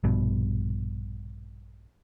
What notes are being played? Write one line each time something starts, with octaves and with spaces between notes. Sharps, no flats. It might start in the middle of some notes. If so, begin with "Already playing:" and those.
A#1 G2 B2